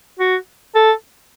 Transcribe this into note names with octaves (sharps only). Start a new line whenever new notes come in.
F#4
A4